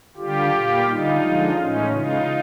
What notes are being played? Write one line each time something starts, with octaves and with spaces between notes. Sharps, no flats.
D3 G3 F4 G4
A#2 G3
D3 G3 D#4 F4
D3 F3 G#3
A2 E3 G#3 C#4 D#4
C#3 E3 G#3 D#4 F4